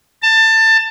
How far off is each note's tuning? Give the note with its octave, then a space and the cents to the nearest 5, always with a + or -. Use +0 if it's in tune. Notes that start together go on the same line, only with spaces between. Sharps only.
A5 +20